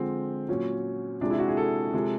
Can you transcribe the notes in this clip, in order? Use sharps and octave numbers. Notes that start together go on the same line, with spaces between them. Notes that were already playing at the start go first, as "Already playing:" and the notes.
Already playing: D3 F3 G#3 C4
A#2 F#3 C#4
C3 F3 G#3 D4
E4
F#4
G#4
A4
C3 F3 G#3